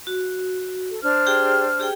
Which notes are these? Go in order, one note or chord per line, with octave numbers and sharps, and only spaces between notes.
F#4
A4
D4 C5 F6
G4 G#4 G5
G4 G#4 G5